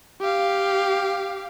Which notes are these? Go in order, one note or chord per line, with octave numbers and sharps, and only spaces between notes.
G4 F5